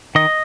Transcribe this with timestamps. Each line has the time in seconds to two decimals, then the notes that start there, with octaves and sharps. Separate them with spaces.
0.15 D#3 D#5